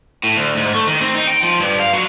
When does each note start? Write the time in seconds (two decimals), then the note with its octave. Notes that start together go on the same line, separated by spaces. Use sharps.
0.24 A2
0.36 D2
0.57 G#2
0.74 A3
0.87 D#3
1.01 C4
1.15 D#4
1.27 G5
1.43 F3
1.60 G2
1.80 F5
1.93 F#3